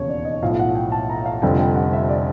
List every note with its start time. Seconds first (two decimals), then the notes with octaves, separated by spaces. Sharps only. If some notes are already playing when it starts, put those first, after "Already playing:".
Already playing: E1 D#2 C#3 C#5
0.09 D5
0.25 D#5
0.42 B1 A2 F3 F5
0.59 F#5
0.75 G5
0.92 A5
1.10 A#5
1.26 F5
1.42 F1 F2 D3 G3 G5
1.59 G5
1.76 F#5
1.93 E5
2.09 D5